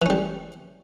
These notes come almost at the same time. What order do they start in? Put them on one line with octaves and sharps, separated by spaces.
E3 C#4 G3